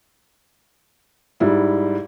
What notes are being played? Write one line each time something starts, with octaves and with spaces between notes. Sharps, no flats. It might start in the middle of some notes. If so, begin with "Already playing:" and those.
G#2 G3 E4